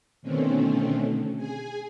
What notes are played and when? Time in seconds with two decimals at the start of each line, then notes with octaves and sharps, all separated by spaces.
0.22 B2 D3 D#3 A3 C4 C#4
1.37 G#4 G#5